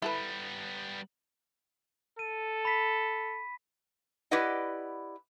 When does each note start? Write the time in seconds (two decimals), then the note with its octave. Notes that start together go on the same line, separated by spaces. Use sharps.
0.02 G3 B3 E4 A4 B4
2.19 A4 D#7
2.65 B5 B6
4.31 E4 G4 B4 D5 D#5 F#5